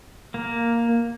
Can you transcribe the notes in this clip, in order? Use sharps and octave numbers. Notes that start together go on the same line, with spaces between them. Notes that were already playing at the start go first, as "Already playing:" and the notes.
A#3